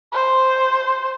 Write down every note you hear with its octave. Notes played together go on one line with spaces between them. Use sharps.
C5